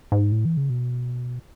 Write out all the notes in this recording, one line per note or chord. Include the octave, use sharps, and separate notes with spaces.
G#2
A2
E3
C#3
B2